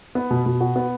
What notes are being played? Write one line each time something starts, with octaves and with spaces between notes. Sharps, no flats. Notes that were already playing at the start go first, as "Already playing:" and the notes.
B3
B2
B2
F#4
B3